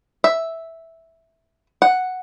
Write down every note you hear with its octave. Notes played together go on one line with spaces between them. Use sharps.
E5
F#5